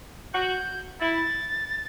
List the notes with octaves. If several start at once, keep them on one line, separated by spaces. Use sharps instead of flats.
F#4 G6
E4 A6